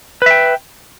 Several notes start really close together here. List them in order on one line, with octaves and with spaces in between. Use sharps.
B4 E5 G5